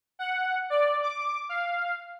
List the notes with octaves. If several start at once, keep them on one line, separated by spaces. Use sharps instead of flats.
F#5
D5
D6
F5